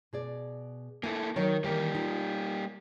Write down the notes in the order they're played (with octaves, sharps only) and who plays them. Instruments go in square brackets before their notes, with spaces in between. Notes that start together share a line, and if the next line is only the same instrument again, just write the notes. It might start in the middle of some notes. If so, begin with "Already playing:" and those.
[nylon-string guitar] B2 G#4 D5
[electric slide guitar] A#3 E4 A4 [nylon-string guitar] G#5
[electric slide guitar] D#3 [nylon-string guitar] F#3 A#4 C#5
[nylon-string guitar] D#3 E3 A#4 [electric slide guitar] G3 A#3 G4
[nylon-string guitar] D#4 F4